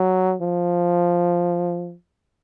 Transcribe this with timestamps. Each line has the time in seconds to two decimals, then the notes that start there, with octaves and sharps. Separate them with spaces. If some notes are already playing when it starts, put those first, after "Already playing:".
Already playing: F#3
0.41 F3